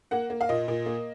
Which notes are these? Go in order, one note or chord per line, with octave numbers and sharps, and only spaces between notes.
A#3 F#5
A#3
F5
A#2 D#5
A#2
A#3